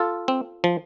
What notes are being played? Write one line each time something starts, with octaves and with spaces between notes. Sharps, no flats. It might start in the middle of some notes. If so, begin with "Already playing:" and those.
Already playing: F4 A4
C4
F3